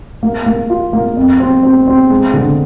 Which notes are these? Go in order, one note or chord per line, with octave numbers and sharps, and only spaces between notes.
A#3
A#3
F4
A#3
F2
C4
C4
C4
G#3
D3